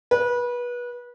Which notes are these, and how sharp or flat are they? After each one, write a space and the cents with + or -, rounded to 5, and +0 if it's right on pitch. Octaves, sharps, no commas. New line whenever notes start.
B4 -25